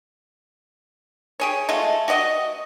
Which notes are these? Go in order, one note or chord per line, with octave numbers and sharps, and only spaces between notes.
G4 G#4 C#5
G#3 A3 F4
F#4 G4 D5 D#5